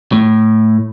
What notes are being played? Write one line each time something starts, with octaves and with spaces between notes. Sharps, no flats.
A2